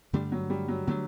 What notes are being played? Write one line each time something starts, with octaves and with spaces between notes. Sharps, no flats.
G2 D3 G3 A3 D4
F#3
G3
F#3
D3 F#3 A3 D4